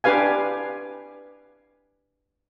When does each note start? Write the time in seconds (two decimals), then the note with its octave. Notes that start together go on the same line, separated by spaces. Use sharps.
0.04 D4 G4 B4 F5 G#5